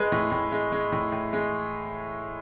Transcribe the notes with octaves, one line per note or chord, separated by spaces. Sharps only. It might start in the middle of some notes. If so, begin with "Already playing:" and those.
Already playing: G#3 B4
A2
A2
G#3
G#3
A2
A2
G#3